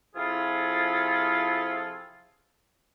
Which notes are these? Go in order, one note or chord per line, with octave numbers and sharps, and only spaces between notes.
C3 F3 E4 F4 G#4 A4